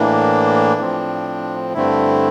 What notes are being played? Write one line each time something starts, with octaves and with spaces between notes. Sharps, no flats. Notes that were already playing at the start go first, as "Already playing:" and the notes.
Already playing: A2 E3 A#3 D4
A2 F3 C4
G2 D3 A3 C4 E4